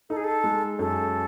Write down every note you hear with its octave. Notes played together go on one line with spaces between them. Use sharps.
D#4 A4
G#4
A4
G#3
F#2 A4